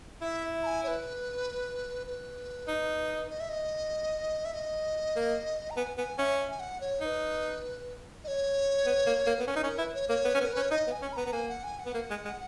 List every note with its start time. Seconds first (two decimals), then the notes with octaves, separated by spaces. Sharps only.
0.21 E4 E5
0.63 A#5
0.66 G#5
0.84 C#5
0.88 B4
2.07 B4
2.68 D#4
3.30 D#5
3.40 E5
3.49 D#5
4.45 E5
4.54 D#5
5.16 A#3
5.70 A#5
5.77 B3 G#5
5.98 B3 G#5
6.19 C#4 E5
6.39 E5
6.50 G#5
6.60 F#5
6.81 C#5
7.01 D#4 C#5
7.05 B4
8.24 D#5
8.28 C#5
8.86 B3
9.07 A#3
9.27 A#3
9.35 B3 A#4
9.48 C#4 B4
9.56 D#4
9.63 C#4 A#4
9.78 E4 B4
9.94 C#5
10.09 A#3 C#5
10.25 B3
10.35 C#4
10.41 B3 A#4
10.53 C#4 B4
10.62 C#5
10.71 D#4 D#5
10.87 B3
10.91 G#5
11.02 C#4
11.13 B5
11.16 B3 A#5
11.26 B3
11.33 A#3 G#5
11.49 F#5
11.64 G#5
11.79 F#5
11.86 B3
11.94 A#3
12.10 G#3
12.25 G#3